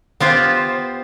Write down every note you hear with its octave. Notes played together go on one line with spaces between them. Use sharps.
B3 F4 G4 C5